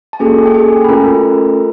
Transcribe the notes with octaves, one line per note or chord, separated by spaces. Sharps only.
A5
A#3 C#4 F#4 G#4 A4 G#5
G5
G#4 G#5
B5
A3 C#4 F4 A4 A#4 A#5